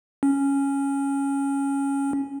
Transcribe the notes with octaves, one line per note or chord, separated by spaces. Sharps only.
C#4